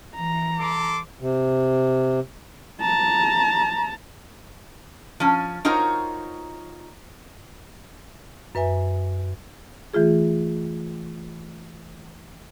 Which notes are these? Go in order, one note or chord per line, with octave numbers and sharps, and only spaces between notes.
E3 A#5
A4 C6 D6
C3
A5 A#5
F3 C#4
D#4 F4 F#4 A#4 C5 C#5
F#2 B4 E5 G#5
E3 A3 F4 G#4